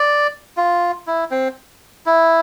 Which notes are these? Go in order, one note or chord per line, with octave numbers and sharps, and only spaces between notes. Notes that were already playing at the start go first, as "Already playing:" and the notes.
Already playing: D5
F4
E4
C4
E4